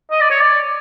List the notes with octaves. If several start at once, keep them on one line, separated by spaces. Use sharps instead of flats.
D#5
D5
C#5
D5